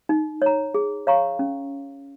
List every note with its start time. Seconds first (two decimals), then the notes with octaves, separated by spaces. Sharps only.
0.09 D#4
0.42 C#5 A#5
0.74 G#4
1.07 C#5 F5 A#5 C#6
1.39 C#4